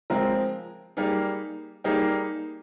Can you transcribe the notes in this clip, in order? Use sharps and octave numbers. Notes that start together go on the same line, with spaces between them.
F3 G#3 C4 F4 A#4
G3 A#3 D#4 G#4
G3 A#3 D#4 G#4